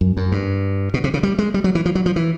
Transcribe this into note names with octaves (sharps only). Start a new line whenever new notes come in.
F#2
F#2
G2
B2
C3
C#3
G3
G#3
G3
F#3
E3
F3
F#3
F3
E3